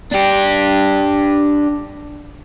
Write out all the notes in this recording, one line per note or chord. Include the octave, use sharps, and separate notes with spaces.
D4 G4